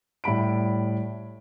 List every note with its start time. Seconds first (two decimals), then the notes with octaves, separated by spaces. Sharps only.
0.24 A2 G3 B5 D7